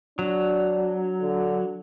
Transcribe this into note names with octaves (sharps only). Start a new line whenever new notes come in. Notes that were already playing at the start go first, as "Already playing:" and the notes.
F#3 D4
D3